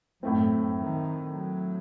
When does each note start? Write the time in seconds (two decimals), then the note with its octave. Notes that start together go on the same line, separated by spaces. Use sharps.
0.22 F#2 A2 A3 C4
0.78 D#3
1.34 F#3